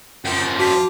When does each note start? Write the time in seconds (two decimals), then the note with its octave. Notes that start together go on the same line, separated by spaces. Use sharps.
0.25 F#2 F3 G5
0.59 F4 F#4 A5 D6 B6